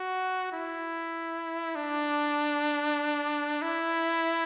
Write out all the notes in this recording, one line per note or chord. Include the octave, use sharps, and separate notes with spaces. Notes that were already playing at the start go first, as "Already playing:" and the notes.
Already playing: F#4
E4
D4
E4